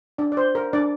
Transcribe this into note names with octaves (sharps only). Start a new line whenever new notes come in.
D4 D5
D5
C5
A#4
D4 D5